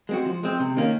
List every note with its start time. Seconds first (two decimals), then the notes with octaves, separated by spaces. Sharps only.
0.09 G#3 C4 F#4
0.26 F3
0.43 G#3 C4
0.60 C3
0.77 D#3 A#3 C#4